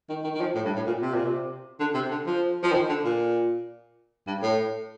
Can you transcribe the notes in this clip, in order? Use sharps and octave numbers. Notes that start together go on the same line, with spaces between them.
D#3
D#3
D#3
F3
A2
G2
A2
A#2
C3
A#2
C3
D3
C3
D3
F3
F3
D#3
D3
A#2
G2
A2